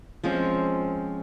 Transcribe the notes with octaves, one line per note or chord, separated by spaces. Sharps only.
F3 G#3 C4 C#4